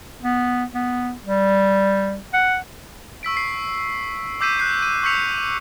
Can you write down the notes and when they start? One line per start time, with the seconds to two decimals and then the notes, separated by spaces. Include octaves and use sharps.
0.23 B3
0.75 B3
1.25 G3
2.34 F#5
3.23 C#6 E6 B6 D7
3.37 C7
4.41 D6 E6 G6 B6 C7 D#7
4.59 F#6 G6 C7
4.82 D#7
5.03 C#6 E6 G6 B6 C#7 F7